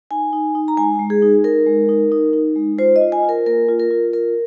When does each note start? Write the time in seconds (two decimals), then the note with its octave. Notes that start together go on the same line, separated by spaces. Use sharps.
0.11 D#4 G#5
0.33 D#4
0.55 D#4
0.68 A#5
0.77 G#3 G#5
0.99 G#3
1.10 G#4
1.22 D#4
1.44 D#4 A#4
1.66 G#3
1.89 D#4
2.12 D#4
2.33 D#4
2.56 G#3
2.78 F4 C5
2.96 D#5
3.01 F4
3.12 G#5
3.23 F4
3.29 A#4
3.46 A#3 A#4
3.68 F4
3.80 A#4
3.91 F4
4.13 F4 A#4